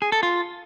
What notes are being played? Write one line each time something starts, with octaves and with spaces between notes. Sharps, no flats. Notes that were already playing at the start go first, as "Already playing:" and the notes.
G#4
A4
F4